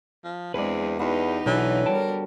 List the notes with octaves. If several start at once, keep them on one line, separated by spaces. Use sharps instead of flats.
F3
E2 G#3 C4 D4 B4 D5
E2 B3 D#4 F#4 G4
B1 D3 E3 F#3
G3 A#4 C#5 G5 A5